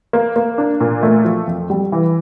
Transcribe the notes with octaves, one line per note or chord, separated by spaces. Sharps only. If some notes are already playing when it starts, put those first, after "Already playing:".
A#3
A#3
D4
A#2
A3
F3
F2
G3
E3